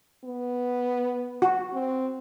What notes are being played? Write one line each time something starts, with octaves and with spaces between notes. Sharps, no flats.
B3
F#4
C4